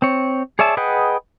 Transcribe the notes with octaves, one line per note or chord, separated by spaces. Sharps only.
C4 C#5
G#4 C#5 D5 E5 A5
G#4 B4 D#5 F#5 G5